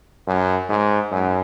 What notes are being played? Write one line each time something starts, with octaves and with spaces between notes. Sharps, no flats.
F#2
G#2
F#2